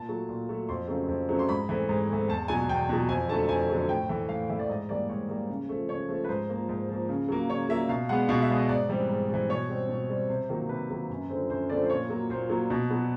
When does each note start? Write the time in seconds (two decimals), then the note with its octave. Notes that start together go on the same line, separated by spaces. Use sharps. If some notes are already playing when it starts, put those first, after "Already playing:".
Already playing: A#2 A5
0.08 F#3 A3
0.29 A#2
0.49 F#3 A3
0.69 F2 C6
0.88 C#3 F#3 A3 C4
1.08 F2
1.29 C#3 F#3 A3 C4
1.39 C6
1.48 G#2 B5
1.69 E3 A3 C4
1.89 G#2
2.09 E3 A3 C4
2.28 E2 A5
2.48 B2 F#3 G#5
2.69 E2 G5
2.89 B2 F#3
3.09 F2 G#5
3.28 D3 F#3 A3 A5
3.49 F2 G#5
3.69 D3 F#3 A3
3.89 A2 G5
4.09 E3 A3
4.29 A2 F5
4.50 E3 A3 E5
4.59 D5
4.69 G#2 D#5
4.89 E3 G3 A#3 D5
5.09 G#2 C#5
5.29 E3 G3 A#3
5.49 C#3
5.69 F3 A3
5.89 C#3 C#5
6.09 F3 A3
6.24 B4
6.29 G#2 C5
6.49 F3 A#3
6.69 G#2
6.89 F3 A#3
7.09 C#3
7.29 F#3 A#3
7.49 C#3 C#5
7.69 F#3 A#3 E5
7.89 B2 F5
8.09 G#3 B3 F#5
8.29 B2 F5
8.42 E5
8.50 G#3 B3
8.56 D#5
8.69 G#2 D5
8.89 E3 G3 C4
9.09 G#2
9.30 E3 G3 C4
9.49 B2 C#5
9.69 G3 C4
9.89 B2
10.09 G3 C4
10.29 C3 C5
10.49 D#3 F#3 A#3
10.69 C3 B4
10.90 D#3 F#3 A#3
11.09 F#2
11.30 D3 F3 A3 C4
11.50 F#2 C5
11.70 D3 F3 A3 C4 D5
11.85 C5
11.90 A#2 C#5
12.10 F#3 A#3
12.30 A#2 C5
12.50 F#3 A#3
12.70 B2
12.90 F#3 B3